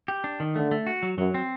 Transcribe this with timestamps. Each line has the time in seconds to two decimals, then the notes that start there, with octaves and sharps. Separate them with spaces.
0.08 G4
0.24 D4
0.40 D#3
0.55 D3 A3
0.71 A3
0.87 F#4
1.03 F#3
1.18 F#2 F#3
1.34 C4